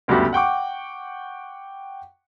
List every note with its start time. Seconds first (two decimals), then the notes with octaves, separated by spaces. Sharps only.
0.08 F#1 D2 G2 B3 F#4 G4
0.33 F#5 G5 C#6 D6